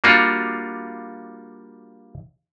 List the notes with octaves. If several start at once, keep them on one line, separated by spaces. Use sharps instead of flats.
G3 A#3 D4 F4 F#4